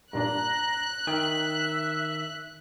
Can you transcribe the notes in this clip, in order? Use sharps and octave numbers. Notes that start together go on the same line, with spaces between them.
G2 A#2 D4 A#5 F#6
D#3 E5 G5